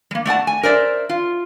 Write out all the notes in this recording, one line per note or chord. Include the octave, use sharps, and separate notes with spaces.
G3 A#3
A3 D5 F#5 A5
G#5
A#4 C5 D5 E5
F4